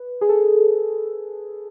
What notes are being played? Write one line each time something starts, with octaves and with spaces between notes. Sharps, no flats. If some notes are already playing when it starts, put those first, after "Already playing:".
Already playing: B4
G#4
A4